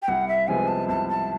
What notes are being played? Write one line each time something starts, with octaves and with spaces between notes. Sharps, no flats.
G5
C2 F#5
E5
C3 F3 G#3 B3 G#5
A5
C2 A5
A5